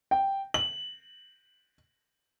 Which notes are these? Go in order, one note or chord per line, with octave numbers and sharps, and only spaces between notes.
G5
F#7